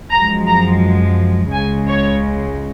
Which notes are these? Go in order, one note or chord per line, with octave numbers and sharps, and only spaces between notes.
F#2 F3 G#3 A#5
A#5
C#2 C#3 G#3 G#5
C#5